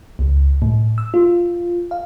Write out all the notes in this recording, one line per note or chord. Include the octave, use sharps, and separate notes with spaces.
C#2
A2
E6
F4
F5